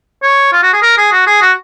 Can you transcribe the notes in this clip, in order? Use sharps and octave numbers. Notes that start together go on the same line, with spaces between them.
C#5
F4
F#4
G#4
A#4
G#4
F#4
G#4
F#4